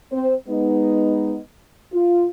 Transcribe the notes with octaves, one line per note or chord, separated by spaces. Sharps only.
C4 C5
G#3 B3 D#4
F4